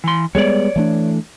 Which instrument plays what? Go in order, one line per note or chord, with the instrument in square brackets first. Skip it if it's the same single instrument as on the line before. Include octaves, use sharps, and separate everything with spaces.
[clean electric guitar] E3 C6
[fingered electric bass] G3 G#3 B3 [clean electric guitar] C#5 D5
[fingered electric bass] E3 A3 D4